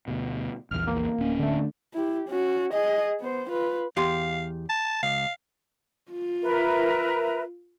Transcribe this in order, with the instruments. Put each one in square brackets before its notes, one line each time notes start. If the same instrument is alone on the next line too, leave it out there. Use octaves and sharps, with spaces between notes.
[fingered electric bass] D2 B2
[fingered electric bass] A#1 E2 [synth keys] F6
[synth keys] A#3
[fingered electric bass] D1 C#4
[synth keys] D3 A3
[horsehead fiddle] E4 G4
C#4 F#4
G#4 D#5
B3 C5
F4 B4
[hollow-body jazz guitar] E2 G4 C6 [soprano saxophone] F5
[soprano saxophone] A5
[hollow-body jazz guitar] C#2 [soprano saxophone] F5
[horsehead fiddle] F4
[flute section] A#4 B4 E5